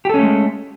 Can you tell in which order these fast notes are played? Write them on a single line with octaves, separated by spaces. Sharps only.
G4 A4 C#4 A3 G#3